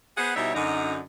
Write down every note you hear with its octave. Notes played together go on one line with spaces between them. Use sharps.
B3 G#4 C5 F#5
B2 G3 D#4 E4 C#5 E5
F#2 D3 D#4